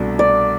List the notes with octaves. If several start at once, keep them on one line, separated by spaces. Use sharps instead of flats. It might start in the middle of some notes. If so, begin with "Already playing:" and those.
Already playing: C2 B2 A3 D4
D5